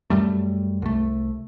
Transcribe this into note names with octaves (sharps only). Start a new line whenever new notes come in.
F#2 G3 A3
C2 A3